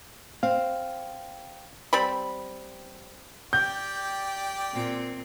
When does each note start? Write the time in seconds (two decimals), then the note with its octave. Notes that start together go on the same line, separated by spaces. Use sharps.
0.43 C4 F5
1.93 G3 C4 B5
3.53 G4 D5 G5 G6
4.73 A#2 C4